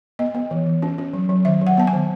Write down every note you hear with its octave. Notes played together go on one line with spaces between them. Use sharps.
B3 D#5
B3
E3
E3
C#4
C#4
F#3
F#3
D#3 E5
F#3
F#5
B3 A5
G#5
D#3